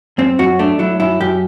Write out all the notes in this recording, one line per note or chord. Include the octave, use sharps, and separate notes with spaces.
F#2 C4
F#2 F#4
A3 D4
F#3 E4
F#2 E4
F#2 G4